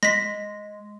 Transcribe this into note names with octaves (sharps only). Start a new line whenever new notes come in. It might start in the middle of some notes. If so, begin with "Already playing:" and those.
G#3 A#6 B6